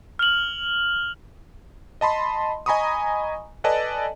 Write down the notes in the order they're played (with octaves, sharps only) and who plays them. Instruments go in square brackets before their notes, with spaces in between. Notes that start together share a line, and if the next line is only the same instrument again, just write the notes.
[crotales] F6 F7 F#7
[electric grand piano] D#5 A5 B5 C6
D#5 G#5 A#5 B5 C#6 D#6
A4 B4 D5 D#5 G#5 A5